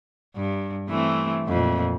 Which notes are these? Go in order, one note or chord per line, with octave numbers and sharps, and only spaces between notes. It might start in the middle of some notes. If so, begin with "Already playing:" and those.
G2
E3 A3 C4
F2 A#2